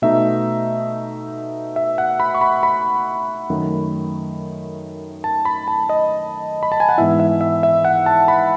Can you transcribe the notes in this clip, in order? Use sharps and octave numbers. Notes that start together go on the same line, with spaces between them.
B2 A3 D#4 E5
E5
F#5
B5
C#6
B5
B5
F#2 D#3 A3
A5
B5
A5
D#5
B5
A5
G#5
F#5
G#2 E3 B3 E4 E5
E5
E5
E5
F#5
A5
B5